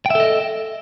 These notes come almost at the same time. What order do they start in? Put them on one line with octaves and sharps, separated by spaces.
G5 E5 A4 D#5